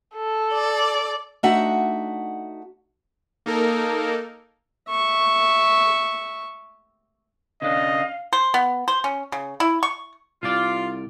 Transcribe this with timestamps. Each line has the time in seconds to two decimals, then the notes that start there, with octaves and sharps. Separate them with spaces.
0.15 A4
0.53 D5
1.43 A3 D4 D#4 F#4 E5 F#5
3.46 A#3 D#4 A4 A#4
4.90 E5 C#6
7.62 C#3 D4 D#5 F5
8.33 C5
8.54 B3
8.88 C5
9.04 C#4
9.32 C#3
9.60 E4
9.83 C#6
10.43 C2 F4 D5